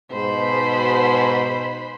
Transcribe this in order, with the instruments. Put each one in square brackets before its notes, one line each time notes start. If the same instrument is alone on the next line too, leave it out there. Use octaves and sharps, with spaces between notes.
[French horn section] G#2 B2 [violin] C5 B5